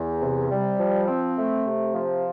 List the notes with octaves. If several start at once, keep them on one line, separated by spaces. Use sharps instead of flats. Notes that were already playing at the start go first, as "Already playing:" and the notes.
Already playing: E2
C3
G3
F3
C4
A3
C3
F3